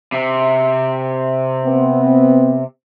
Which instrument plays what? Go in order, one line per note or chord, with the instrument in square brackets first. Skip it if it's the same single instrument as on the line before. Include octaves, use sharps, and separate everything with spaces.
[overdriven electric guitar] C3
[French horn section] B3 C4